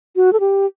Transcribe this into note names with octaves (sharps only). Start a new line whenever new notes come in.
F#4
A4
G4